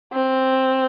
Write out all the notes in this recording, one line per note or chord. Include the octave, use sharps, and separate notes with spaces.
C4